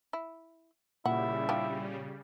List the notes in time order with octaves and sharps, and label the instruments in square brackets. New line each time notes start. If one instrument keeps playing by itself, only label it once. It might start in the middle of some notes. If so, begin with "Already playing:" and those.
[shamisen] E4
[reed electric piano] A#2 [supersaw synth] C#3 G3 [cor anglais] E4 [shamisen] F#5
[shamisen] F3 D4 G4